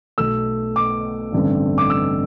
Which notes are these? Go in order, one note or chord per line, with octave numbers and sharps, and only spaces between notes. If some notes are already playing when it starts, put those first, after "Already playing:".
B1 B2 A3 E6
D6
A1 G2 D3 A3 C4
D6
E6